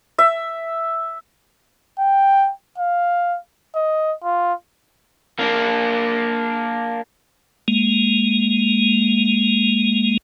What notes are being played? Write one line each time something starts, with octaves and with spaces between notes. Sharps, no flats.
E5
G5
F5
D#5
F4
A#3 D4
G#3 A#3